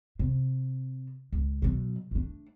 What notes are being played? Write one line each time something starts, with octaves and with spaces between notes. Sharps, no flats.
C3
C#2
B2 F#3
A3 D4